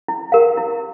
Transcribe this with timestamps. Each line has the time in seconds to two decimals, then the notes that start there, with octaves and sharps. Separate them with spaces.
0.08 E4
0.32 G4 A#4 F5
0.57 E4